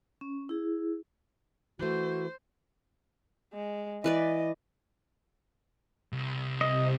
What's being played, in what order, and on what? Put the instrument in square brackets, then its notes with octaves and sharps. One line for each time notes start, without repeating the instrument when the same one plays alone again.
[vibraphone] C#4
E4 G#4
[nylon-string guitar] E3 A3 [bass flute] F#4 [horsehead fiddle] C5
[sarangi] G#3
[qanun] E3 B4 D5 [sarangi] D#5
[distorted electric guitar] C2
[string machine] C3 [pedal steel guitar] D#5